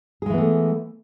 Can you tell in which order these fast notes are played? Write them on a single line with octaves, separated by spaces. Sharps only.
G#4 G#3 E3 B3 A3